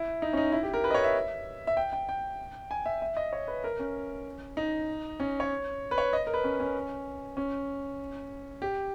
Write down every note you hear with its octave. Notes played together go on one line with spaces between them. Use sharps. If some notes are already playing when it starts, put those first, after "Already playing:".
Already playing: E4
D#4
C#4
D#4
E4
G4
A#4
B4
D#5
C#5
E5
E5
G5
G5
G5
G#5
E5
E5
D#5
C#5
B4
A#4
C#4
D#4
C#4
C#5
B4
C#5
D#5
A#4
B4
C#4
C#4
C#4
G4